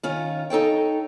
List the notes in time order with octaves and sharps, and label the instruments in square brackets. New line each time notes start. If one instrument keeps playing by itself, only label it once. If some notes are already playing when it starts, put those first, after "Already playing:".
[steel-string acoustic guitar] D#3 C#4 F4
D#4 A4 C#5 G5